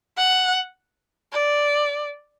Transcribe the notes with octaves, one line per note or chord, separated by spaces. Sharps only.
F#5
D5